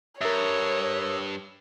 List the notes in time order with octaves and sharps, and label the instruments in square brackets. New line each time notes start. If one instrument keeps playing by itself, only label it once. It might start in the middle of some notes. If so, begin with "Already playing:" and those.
[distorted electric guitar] G2 [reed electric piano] A#4 E5 [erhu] C#5 [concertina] D#6 E6 F#6